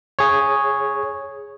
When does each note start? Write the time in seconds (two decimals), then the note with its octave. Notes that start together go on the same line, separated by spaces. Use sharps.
0.19 G#4 C#5